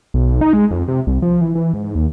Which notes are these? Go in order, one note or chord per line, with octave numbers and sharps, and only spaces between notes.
B1
B1
D#4
G#3
F2
C3
C2
F3
E3
E3
G#2
D#2